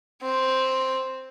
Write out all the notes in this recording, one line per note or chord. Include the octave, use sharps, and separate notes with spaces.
C4